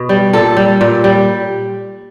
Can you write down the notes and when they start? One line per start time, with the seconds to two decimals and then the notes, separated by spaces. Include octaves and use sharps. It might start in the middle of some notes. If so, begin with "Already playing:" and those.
Already playing: B2
0.09 G3
0.33 A#2 A4
0.57 G3
0.81 A#2
1.04 G3